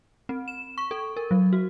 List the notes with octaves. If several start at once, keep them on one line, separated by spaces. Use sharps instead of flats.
C4
E7
C#6
A4
A#4
F#3
F#4